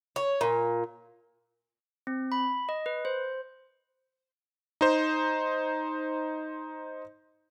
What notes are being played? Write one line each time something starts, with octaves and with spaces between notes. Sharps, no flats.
C#5
A#2
C4
B5
D#5
B4
C5
D#4 C5